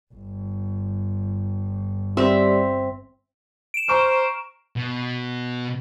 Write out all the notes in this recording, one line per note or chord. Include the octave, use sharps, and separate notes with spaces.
G1
G3 C4 E5
D7 E7
C5 A#5 C#6 F6
B2